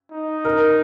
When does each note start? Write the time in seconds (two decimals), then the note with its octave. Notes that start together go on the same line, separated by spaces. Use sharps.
0.12 D#4
0.45 A#4